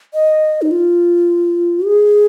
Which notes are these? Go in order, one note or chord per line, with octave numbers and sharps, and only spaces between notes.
D#5
D#4
F4
G#4